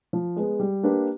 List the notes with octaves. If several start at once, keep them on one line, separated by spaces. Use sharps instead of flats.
F3
G#3 B3
G3
A#3 D4 G4 B4